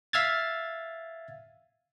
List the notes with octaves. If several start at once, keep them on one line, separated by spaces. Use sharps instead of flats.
E5 F5 E6 F6 G#6 A6